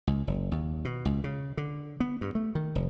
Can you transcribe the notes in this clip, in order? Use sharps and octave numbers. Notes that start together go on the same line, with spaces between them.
C#2
F#1
D#2
B2
C#2
C#3
D3
B3
G2
A3
D#3
F1